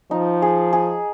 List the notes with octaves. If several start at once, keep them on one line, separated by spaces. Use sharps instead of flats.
F3 D#4
G#4
G#4